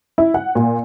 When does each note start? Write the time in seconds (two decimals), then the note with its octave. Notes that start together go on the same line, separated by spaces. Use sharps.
0.18 E4
0.34 F#5
0.55 A#2